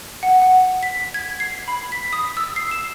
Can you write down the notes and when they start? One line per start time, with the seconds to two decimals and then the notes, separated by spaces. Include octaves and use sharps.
0.23 F#5
0.42 F#5
0.83 B6
1.14 G#6
1.40 C7
1.68 B5
1.92 B6
2.13 D#6
2.37 E6
2.56 C7
2.71 E7